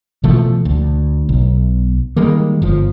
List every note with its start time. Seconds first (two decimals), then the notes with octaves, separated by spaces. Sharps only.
0.24 B2 E3 F3 A3
0.65 D2
1.29 B1
2.17 D#3 G3 G#3 A#3
2.62 G1 F3